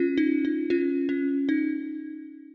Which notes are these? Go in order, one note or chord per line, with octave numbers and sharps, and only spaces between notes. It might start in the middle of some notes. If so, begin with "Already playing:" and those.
Already playing: C#4 F4
D#4
D#4
C#4 F4
C#4
D#4